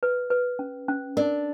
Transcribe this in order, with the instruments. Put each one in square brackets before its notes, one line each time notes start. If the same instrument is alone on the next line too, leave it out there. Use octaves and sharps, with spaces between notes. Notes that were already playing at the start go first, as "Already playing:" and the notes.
[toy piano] B4
B4
C#4
C#4
[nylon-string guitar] D4 [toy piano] A#4